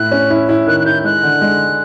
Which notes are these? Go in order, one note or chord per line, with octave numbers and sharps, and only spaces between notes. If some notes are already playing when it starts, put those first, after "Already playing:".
Already playing: A2 E4 F#6
C#4
E4
E4
D#3 F#6
F#6
E4 G6
G#3 F#6
D3
G#3